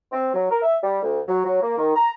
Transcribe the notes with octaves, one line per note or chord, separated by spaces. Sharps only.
C4
F#3
A#4
E5
G3
D2
F#3
F#3
A#3
D#3
A#5